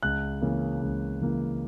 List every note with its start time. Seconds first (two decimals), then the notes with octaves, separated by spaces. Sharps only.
0.03 C#2 F#6
0.42 C#3 E3 A#3
0.82 C#2
1.21 C#3 E3 A#3